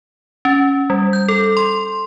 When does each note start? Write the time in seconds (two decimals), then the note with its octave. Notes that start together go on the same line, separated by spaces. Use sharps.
0.45 C#4
0.90 G3
1.13 G6
1.28 A4
1.57 C6